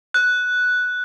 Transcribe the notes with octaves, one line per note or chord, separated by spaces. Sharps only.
F#6